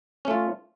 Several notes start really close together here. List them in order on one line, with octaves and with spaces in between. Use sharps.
C#4 A3 F4